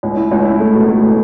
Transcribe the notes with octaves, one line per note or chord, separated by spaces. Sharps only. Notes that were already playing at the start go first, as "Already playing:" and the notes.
C#2
E4
C#2
E4
A3
B2
A3
B2